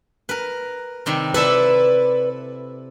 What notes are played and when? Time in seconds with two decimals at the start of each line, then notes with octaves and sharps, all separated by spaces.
0.29 A#4 B4
1.06 C3 D#3 G3
1.34 E4 A4 B4 D5 E5